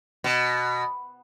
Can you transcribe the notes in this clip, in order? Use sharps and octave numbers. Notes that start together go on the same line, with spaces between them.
B2